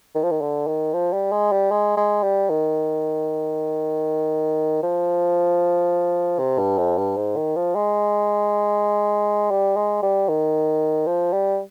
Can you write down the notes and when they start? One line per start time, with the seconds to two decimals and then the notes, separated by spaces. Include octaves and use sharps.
0.15 D#3
0.23 F3
0.31 D#3
0.41 D3
0.67 D#3
0.93 F3
1.12 G3
1.32 G#3
1.52 G3
1.71 G#3
1.97 G#3
2.23 G3
2.49 D#3
4.83 F3
6.39 C3
6.59 G2
6.78 F2
6.98 G2
7.17 G#2
7.36 D#3
7.56 F3
7.75 G#3
9.50 G3
9.77 G#3
10.02 G3
10.28 D#3
11.06 F3
11.33 G3